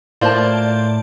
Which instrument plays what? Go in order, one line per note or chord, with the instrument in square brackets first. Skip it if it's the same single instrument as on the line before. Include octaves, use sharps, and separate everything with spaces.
[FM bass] A2 [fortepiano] A#3 F4 C5 [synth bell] D5 A5